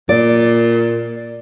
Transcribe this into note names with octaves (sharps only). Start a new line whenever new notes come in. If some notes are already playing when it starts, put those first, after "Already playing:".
A#2 D5